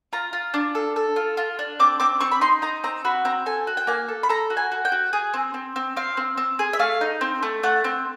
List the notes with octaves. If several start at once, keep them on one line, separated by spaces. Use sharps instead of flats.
F4 A#5
F4
D4
A4
A4
F4
F4
D4
C4 D6
C4 D6
C4 C#6
B5
D#4 C6
D#4 A#5
C4 A#5
F#4 B5
C4 A#5
A4 G#5
F#4
G5
A#3 G#5
A4
B5
A4 A#5
F#4
G#5
F#4
G5
F#4
G#4
C4
C4
C4
C4 F5
C4
C4
G#4
E5
A3 F5
D#4
C4
A3
A3 F#5
C4